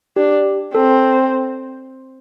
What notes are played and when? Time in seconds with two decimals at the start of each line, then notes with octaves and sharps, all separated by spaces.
0.16 D4 G4
0.74 C4 A4